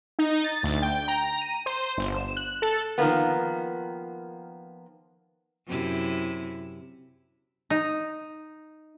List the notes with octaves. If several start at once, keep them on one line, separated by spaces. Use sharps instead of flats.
D#4
A6
D2
G5
A#5
D#7
C5
G1
E7
F#6
A4
D#3 F3 A#3 B3
F#2 C3 E4
D#4